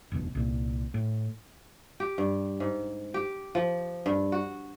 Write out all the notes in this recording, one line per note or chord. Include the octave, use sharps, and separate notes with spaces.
F1 D#2 B2
C2 A#2
A2
G4
G2
G#2
G4
F3
G2
F#4